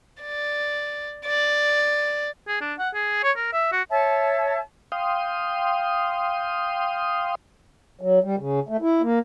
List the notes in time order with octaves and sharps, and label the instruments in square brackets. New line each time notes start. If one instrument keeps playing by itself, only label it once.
[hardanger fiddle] D5
D5
[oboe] G#4
D4
F#5
G#4
C#5
A#4
E5
F#4
[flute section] C#5 E5 A5
[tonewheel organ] F5 G5 C6 D#6
[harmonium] F#3
G3
C#3
A3
E4
A#3